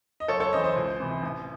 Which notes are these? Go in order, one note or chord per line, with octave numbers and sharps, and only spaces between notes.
D#5
F#1 A4 C#5
A4 C#5
F#2 E3 C5 D#5
C5 D#5
C#2
C3 E3
A1